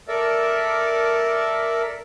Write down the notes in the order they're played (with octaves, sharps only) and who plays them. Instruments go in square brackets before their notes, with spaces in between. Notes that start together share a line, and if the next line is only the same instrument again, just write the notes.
[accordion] A4 A#4 D5 E5